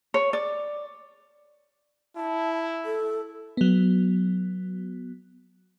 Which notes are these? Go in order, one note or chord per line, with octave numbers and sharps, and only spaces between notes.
C#5
D5
E4 A5
A4
F#3 B3